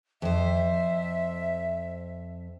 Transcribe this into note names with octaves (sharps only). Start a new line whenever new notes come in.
F2 C5 E5